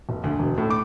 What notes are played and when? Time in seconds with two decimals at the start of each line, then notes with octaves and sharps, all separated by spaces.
0.09 F1
0.24 D2
0.39 E1
0.58 A2
0.70 D6